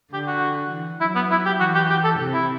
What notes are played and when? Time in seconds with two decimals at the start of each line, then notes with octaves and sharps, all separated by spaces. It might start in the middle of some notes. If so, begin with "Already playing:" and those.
0.13 D3 G4
0.27 F#4
0.71 E3
1.00 F#3 E4
1.15 B3
1.31 F#3 E4
1.46 G4
1.60 E3 F#4
1.75 G4
1.90 G4
2.04 A4
2.19 C3
2.34 E4